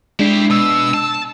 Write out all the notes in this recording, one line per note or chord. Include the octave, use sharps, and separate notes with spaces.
G#3 D4 E4 G4 C7
B2 E6
A5